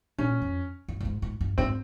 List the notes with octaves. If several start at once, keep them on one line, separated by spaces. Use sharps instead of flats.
A#2 C#4
F2
G2
A#2
G#2
G#2
G2
G#2 C4